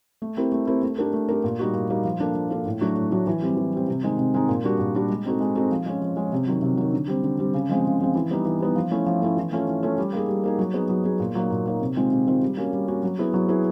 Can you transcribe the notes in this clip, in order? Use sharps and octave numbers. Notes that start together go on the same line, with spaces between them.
A3
C4 E4 G4 A#4
A3
C4 E4 G4 A#4
A3
D4 G4 A#4
A3
D4 G4 A#4
A#2
G3 A#3 D#4 F#4
A#2
G3 A#3 D#4 F#4
F3
A#3 D4 F4 A4
F3
A#3 D4 F4 A4
A2
F#3 A3 D4 F#4
A2
F#3 A3 D4 F#4
E3
G3 C4
E3
G3 C4
C3
D#3 G#3 C4 D#4
C3
D#3 G#3 C4 D#4
A#2
G3 A#3 D4 F#4
A#2
G3 A#3 D4 F#4
G#3
C4 D#4 F#4 A4
G#3
C4 D#4 F#4 A4
F3
G#3 C#4
F3
G#3 C#4
C3
D#3 F#3
C3
D#3 F#3
D3
G3 C4
D3
G3 C4
C#3
F3 G#3 C4
C#3
F3 G#3 C4
E3
G3 B3 D#4
E3
G3 B3 D#4
F3
A3 C#4 E4 A4
F3
A3 C#4 E4 A4
E3
A3 C#4 F4 A4
E3
A3 C#4 F4 A4
G3
A#3 D#4 G#4
G3
A#3 D#4 G#4
F#3
B3 D#4 G#4
F#3
B3 D#4 G#4
A#2
F#3 A#3 D#4
A#2
F#3 A#3 D#4
C3
D#3 G#3 C4 F4
C3
D#3 G#3 C4 F4
G3
A#3 C#4 F#4
G3
A#3 C#4 F#4
F#3
B3 E4 G#4
F#3
B3 E4 G#4